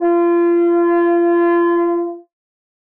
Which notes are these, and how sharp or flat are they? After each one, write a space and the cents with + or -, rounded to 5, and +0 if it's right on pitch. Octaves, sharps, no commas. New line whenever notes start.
F4 -30